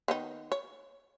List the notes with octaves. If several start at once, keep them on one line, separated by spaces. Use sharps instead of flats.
D#3 B3 D#4
C#5